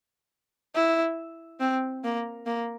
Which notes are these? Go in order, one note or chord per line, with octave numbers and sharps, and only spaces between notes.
E4
C4
A#3
A#3